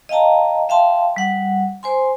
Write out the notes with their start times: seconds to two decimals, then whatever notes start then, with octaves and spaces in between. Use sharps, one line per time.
0.09 D#5 F5 G5 A5 A#5
0.69 E5 F5 G5 A5 C6
1.16 G3 F#5
1.83 C5 G#5 C6